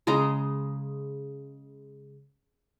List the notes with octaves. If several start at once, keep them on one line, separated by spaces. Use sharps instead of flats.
C#3 G#3 D#5 A#5